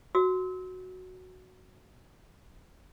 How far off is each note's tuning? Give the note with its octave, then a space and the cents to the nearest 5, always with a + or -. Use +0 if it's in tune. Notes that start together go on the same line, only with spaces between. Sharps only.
F#4 -5 E6 -35